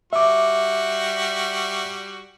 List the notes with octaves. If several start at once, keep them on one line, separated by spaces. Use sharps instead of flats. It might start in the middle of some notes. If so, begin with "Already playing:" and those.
G3 F#4 E5 D6